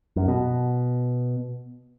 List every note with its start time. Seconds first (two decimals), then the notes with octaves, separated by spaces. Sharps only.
0.16 F#2
0.28 B2